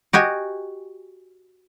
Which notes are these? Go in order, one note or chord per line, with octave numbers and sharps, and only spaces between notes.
F#4 G4 D#5 G#5